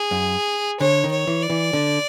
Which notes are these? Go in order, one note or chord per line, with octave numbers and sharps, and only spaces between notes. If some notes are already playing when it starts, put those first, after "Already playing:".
Already playing: G#4
F#2
D3 C#5
D#3
C#5
E3
D5
E3
D3